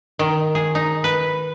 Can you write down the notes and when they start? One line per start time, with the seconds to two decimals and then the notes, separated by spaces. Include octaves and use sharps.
0.19 D#3
0.55 G#4
0.75 D#4
1.04 B4